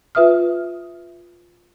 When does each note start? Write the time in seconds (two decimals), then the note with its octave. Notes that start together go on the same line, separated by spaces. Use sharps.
0.15 F4 B4 E5 D#6 F6